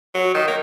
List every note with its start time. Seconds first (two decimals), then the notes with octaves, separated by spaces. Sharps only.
0.14 F#3
0.34 D#3
0.48 A#3